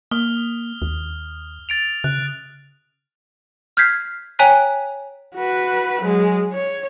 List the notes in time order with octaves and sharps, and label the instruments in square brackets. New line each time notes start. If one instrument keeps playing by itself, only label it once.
[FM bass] A#3 [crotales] D#6 F6 G7
[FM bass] D#2
[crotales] A6 D7 F7
[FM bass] C#3 [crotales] F#6
[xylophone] F6 G6 G#6 B6 C7
C#5 G5 G#5 A#5 F#6 B6
[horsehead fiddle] F#4 B4
F#3 G#3
C#5